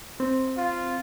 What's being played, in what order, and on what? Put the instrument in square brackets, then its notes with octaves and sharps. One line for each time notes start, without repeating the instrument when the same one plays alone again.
[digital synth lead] C4
[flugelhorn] F4